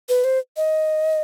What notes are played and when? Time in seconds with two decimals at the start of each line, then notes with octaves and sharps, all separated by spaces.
0.09 B4
0.24 C5
0.57 D#5